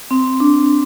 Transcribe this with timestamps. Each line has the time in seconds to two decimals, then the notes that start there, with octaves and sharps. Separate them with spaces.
0.11 C4
0.40 D4